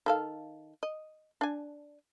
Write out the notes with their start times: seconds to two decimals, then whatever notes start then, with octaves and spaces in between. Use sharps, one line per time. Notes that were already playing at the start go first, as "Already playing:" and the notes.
0.06 D#3 A4 F5
0.83 D#5
1.41 D4 G#5